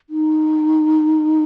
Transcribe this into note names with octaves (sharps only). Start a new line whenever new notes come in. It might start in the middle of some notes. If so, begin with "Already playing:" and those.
D#4